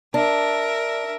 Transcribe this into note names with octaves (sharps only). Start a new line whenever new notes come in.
D4 A#4 E5